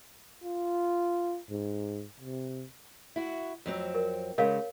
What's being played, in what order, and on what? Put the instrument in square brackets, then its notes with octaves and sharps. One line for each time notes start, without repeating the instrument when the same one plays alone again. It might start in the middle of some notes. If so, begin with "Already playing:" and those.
[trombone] F4
G#2
C3
[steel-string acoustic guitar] E4 F#4
F2 F#3 C4
[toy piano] A#4
[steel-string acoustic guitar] C#3 G#3 [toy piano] A#4 C#5 F5